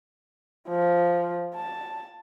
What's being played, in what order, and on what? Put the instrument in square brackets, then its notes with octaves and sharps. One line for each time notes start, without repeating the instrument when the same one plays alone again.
[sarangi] F3
A5